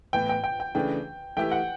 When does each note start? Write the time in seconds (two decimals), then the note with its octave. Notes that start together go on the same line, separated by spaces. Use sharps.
0.13 A2 E3 B3 G5
0.29 G5
0.44 G5
0.60 G5
0.75 C#3 E3 A3 D4 G5
1.37 E3 A3 E4 G4 G5
1.51 F#5